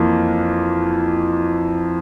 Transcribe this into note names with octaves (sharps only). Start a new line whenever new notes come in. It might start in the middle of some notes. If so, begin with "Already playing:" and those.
Already playing: F2 E3 A#3